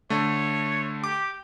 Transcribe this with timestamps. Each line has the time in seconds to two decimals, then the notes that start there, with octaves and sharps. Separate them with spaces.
0.10 D3 A3 C#5
1.04 G4 D6